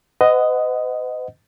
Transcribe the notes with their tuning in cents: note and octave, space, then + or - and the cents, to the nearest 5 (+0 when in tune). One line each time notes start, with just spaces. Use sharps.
B4 +45 D#5 +0 F#5 +0